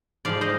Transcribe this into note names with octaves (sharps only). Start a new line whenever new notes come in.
G#2 F3 G#3 D5 F5
C5 D#5